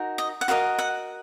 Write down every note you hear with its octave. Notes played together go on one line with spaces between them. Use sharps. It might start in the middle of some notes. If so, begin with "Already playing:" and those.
Already playing: D#4 F#4 A#4
D#5
F#5
F#4 A#4 D#5 F5
F#5